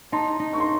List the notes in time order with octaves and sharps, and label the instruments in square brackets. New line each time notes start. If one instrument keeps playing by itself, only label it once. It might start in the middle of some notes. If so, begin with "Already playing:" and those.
[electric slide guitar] D#4 [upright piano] A5 C6
[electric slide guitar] D#4
[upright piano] C#6
C6